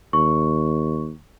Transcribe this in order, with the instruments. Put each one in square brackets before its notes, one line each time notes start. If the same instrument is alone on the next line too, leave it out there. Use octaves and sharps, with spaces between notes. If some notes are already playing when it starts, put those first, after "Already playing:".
[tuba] D#2 [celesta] C#6